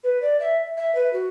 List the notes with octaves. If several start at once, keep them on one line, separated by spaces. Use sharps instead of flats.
B4
D5
E5
E5
B4
F#4